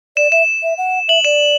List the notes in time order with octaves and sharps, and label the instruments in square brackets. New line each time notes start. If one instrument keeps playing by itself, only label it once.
[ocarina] D5 [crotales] E7
[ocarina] E5 [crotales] E7
[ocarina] E5
F#5
[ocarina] E5 [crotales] F#7
[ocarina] D5 [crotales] E7